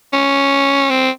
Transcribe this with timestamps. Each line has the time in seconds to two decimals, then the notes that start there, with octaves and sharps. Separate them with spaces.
0.13 C#4
0.90 C4